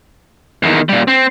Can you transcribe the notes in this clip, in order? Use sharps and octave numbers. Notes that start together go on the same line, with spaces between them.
E2 D#3
A#2 G3
C4